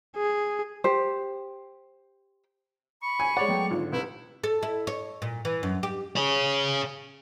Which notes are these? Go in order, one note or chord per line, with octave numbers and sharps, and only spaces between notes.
G#4
G4 C5
B5 C#6
G#5
G#3 C#5 D5 F#5
F#3 A3 B3 G5
G#1 D3 F4
C2 E4 B4
A4
E4
C#5
A#2
E3
F#2
G4
G#4 C#5